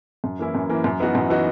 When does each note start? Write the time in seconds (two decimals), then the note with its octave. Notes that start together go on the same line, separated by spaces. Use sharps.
0.24 F#2
0.39 E3 A#3 C#4 E4
0.55 F#2
0.70 E3 A#3 C#4 E4
0.84 F#2
1.00 E3 B3 D#4 F#4
1.15 F#2
1.30 E3 B3 D#4 F#4